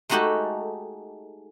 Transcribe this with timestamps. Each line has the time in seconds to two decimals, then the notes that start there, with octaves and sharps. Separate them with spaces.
0.09 G#3 A3 D#4 F#4 G4 A4